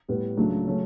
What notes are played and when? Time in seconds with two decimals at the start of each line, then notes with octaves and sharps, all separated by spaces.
0.08 A2 G3 B3
0.37 C#2 C#3 F#3 A3 D4
0.66 C#3 F#3 A3 C#4